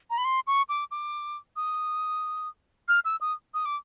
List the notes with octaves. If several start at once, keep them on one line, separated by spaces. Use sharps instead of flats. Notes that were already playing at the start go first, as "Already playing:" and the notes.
A#5
B5
C6
C#6
D6
D6
D#6
F6
E6
D#6
D#6
D6